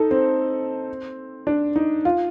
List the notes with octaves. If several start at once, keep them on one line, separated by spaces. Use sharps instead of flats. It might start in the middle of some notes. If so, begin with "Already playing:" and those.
Already playing: D#4 A4
C4
D4
D#4
F4